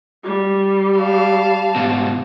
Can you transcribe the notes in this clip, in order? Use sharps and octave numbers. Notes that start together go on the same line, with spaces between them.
G3
F5 A5
G#2 B2